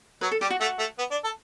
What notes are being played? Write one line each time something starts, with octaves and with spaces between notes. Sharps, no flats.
F#3 B4
A4
G3 G4
F#4
A3 F#4
A3
B3
D4
A4